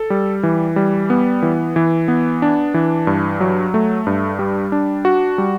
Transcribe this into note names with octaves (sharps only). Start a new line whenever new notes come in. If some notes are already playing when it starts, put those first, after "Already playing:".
Already playing: A4
G3
E3
G3
B3
E3
E3
B3
D4
E3
G2
F#3
A3
G2
G3
D4
F#4
G3